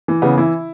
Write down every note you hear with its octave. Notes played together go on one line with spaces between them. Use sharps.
E3
C#3 B3
E3 E4